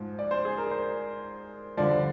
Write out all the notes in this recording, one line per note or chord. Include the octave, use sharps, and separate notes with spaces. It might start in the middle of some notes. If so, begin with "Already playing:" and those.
Already playing: G#2 F3
D5
C5
G#4
A#4
C5
G2 D3 F3 D5